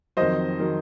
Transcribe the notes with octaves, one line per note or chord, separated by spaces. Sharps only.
F2 D#3 F#3 C5 D#5
D#3 F#3